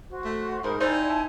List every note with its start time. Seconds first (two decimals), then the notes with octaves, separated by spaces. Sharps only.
0.09 F#4 C5
0.24 A3
0.64 G#2 D#4 A#4 C5 A#5 B5
0.80 G3 C4 D#4 E4 C5 D5 G#5
1.09 A5